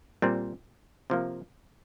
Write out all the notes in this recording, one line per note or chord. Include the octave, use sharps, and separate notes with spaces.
A#2 G3 C4
C3 F3 A#3